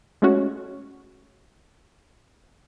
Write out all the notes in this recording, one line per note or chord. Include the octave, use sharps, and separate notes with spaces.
G#3 A3 C#4 F#4